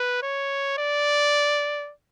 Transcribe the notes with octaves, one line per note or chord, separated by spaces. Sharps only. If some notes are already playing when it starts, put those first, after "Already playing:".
Already playing: B4
C#5
D5